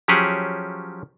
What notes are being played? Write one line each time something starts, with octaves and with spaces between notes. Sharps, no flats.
F3 F#3 C#4 G4 G#4